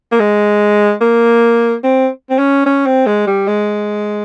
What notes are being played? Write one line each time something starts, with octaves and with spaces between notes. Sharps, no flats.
A#3
G#3
A#3
C4
C4
C#4
C#4
C4
G#3
G3
G#3